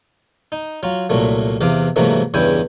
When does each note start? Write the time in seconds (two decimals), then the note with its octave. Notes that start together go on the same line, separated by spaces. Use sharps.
0.52 D#4
0.83 F#3 F4
1.10 C2 A#2 F#3 A3
1.61 E2 C3 E3 F5 D6
1.96 G#2 C3 E3 F#3 A3 A#3
2.34 E2 G2 C#3 E4 G5 G#5